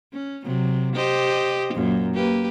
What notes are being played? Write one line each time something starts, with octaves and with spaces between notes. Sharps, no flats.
C#4
C3 F#3
G4 C5 D#5
F#2 A#2
A#3 G4 B4